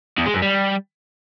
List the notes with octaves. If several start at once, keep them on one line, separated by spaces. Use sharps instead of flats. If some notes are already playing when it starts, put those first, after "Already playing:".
E2
G#3
F#2
G3